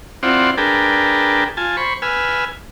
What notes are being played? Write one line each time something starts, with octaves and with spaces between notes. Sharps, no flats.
C4 E4 F4 C5 D5 F#5
D4 G#4 A#4 B4 G5 A5
F4 G#5 A5
C5 B5 C#6
B4 G#5 E6 F6